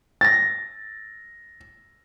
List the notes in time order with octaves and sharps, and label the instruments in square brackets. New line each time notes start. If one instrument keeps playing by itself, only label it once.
[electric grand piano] A6 A#6